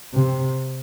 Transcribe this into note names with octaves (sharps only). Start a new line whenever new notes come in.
C3